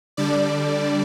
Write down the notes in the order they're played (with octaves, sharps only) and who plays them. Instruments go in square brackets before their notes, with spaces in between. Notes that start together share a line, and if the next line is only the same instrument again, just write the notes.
[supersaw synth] D3 G3 D4 D5